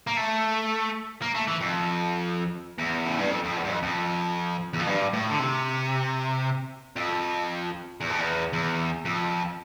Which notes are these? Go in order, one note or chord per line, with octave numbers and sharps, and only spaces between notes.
A#3
A3
A#3
A3
E3
F2
E2
A2
G2
F2
F2
E2
G2
F2
F2
E2
F2
G2
A2
D3
C3
F2
E2
F2
E2
E2
F2